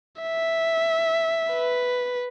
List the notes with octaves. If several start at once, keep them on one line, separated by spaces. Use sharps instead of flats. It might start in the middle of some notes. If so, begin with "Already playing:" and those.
E5
B4